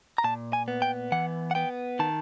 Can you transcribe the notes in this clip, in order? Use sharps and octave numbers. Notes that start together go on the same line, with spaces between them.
A#5
A#2 A5
G#5
B3
G5
E3 F#5
F#5
B3 G5
D#3 A5